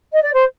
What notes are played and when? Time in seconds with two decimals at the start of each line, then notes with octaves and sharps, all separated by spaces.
0.11 D#5
0.22 D5
0.33 C5